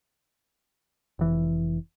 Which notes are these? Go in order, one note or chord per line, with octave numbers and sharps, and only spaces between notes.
F1 E3